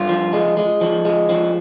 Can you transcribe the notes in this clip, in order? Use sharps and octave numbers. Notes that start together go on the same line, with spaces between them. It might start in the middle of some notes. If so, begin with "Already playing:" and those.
Already playing: G2 F4
F3
G#3
G#3
F3
G#3
F3